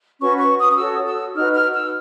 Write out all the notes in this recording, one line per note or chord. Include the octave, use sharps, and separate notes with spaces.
C#4 F#4 B4 C#6
C#6
D#6
D#6
F#4 A4 C#5 E6
E6
D#4 F#4 B4 F6
F6
E6